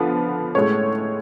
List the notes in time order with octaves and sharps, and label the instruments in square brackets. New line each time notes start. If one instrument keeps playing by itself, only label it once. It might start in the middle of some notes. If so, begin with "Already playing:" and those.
Already playing: [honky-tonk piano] D3 F3 B3 B4
A2 G#3 C#4 C#5